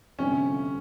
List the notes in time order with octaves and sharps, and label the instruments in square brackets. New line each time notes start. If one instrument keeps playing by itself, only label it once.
[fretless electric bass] G1 F2 C3 [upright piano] C#4